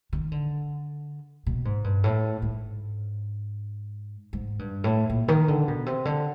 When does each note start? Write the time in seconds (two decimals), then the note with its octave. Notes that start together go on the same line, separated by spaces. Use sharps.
0.13 D#3
0.32 D3
1.47 B2
1.65 G#2
1.84 G2
2.04 A2
2.42 G#2
4.33 G#2
4.59 G2
4.84 A2
5.10 A#2
5.28 D#3
5.48 D3
5.68 B2
5.86 C3
6.05 D3